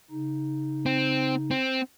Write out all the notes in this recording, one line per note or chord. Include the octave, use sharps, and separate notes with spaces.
C#3 D#4
C4
C4